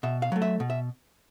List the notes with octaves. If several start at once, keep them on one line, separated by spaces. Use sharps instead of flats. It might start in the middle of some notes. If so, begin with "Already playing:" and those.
B2 E5
F5
F#3 A3
E5
B2
E5